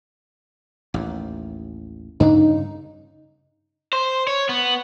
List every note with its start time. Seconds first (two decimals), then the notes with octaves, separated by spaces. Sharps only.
0.94 A1 D#2
2.20 G2 C#3 D4 D#4
3.93 C5
4.27 C#5
4.49 B3